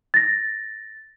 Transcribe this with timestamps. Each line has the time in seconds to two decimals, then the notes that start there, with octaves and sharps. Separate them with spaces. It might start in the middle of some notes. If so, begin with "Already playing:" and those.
0.14 A6 A#6